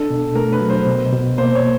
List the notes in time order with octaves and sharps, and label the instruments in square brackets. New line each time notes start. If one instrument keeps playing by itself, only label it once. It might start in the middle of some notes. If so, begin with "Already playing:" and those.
Already playing: [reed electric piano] D4 [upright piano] A4
[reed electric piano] B2
[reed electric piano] A3 [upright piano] A#4
[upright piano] B4
[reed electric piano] F#3
[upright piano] C5
[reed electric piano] B2
B2
[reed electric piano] A#3 [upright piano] C5
[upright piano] C#5